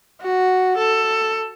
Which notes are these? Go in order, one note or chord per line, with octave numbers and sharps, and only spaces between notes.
F#4
A4